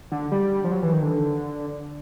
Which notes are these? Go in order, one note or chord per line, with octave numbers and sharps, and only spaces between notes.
D3
G3
F3
F#3
E3
D#3
D3